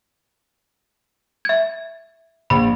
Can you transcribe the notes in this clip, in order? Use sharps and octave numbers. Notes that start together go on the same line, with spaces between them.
E5 G#6
A#1 B5